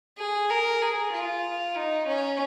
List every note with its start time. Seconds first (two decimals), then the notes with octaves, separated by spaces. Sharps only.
0.19 G#4
0.50 A#4
0.82 G#4
1.14 F4
1.76 D#4
2.08 C#4